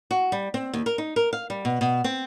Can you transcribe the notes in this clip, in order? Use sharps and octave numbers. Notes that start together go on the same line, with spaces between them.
F#4
G3
C4
D#2
A#4
D#4
A#4
F5
G3
B2
B2
C4